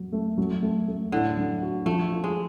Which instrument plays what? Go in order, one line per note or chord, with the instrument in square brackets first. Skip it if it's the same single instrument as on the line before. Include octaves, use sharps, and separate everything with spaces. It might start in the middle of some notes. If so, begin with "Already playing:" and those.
Already playing: [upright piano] F#3
A3
F#3
A3
A3
[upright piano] A2 [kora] D3
[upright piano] F#3
F#4
[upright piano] F3 [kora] A3
[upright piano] F4
[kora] G#3